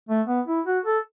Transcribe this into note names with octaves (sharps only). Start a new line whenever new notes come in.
A3
B3
E4
F#4
A4